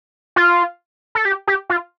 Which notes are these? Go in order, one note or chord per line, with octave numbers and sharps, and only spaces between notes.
F4
A4
G4
G4
F4